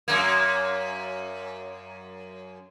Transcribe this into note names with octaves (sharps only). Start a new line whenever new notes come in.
F#2 A#3